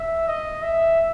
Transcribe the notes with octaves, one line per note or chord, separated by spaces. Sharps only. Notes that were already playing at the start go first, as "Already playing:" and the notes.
Already playing: E5
D#5
E5